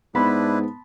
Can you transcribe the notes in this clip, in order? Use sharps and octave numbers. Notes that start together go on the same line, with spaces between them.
G#2 B3 D4 E4 B4 A5 B5 C6